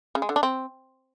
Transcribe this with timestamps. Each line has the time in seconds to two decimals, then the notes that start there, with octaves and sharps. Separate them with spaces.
0.15 C#3
0.22 G#3
0.29 D3
0.36 D4
0.43 C4